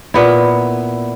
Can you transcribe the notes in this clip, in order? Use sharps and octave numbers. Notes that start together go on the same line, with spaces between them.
A#2 B3 E4